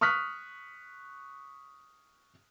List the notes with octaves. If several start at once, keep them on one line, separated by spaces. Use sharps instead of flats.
C#6 D#6 F6 F#6 B6